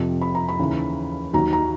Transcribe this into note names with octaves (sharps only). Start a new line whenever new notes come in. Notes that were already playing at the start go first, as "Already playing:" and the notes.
Already playing: F2 C3 F3
B5
A#5
B5
D#2 C#3 E3
D#2 D#3 F#3 A#5
A#5